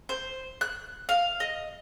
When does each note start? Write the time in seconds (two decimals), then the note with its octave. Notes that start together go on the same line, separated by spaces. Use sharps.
0.09 C5
0.61 F#6
1.09 F5
1.40 D#5